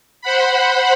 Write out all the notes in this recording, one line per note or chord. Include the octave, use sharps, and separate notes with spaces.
C5 F#5 B5